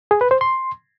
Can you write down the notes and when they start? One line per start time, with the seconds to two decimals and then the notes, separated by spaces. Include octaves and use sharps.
0.11 G#4
0.21 B4
0.31 C5
0.41 C6